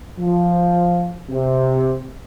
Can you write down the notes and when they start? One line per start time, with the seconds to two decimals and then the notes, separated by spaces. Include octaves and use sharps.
0.18 F3
1.29 C3